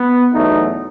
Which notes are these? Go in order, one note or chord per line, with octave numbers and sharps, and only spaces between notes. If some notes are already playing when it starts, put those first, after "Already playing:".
Already playing: B3
E2 B2 F#3 A3 D#4